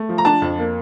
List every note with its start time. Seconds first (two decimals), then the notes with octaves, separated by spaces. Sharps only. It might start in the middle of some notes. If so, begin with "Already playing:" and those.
Already playing: A3
0.09 F3
0.18 A#5
0.25 D4 A5
0.42 F2
0.58 A#3